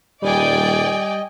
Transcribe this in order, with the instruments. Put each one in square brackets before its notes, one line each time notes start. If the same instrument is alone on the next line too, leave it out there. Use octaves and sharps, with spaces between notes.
[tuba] D#1 [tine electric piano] G3 [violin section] D5 G5 G#5 [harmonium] D#5